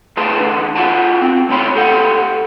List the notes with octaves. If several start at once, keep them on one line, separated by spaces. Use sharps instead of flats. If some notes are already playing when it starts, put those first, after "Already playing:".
D2 A3 G#4 B4 A5 C6
D3 E3 D4
F4 F#4 G#4 F#5 G#5 A5
C4
A2 D3 D4 C#5 B5 C6
D2 G4 A4 F#5